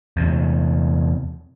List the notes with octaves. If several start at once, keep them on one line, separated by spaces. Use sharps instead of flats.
E2 C3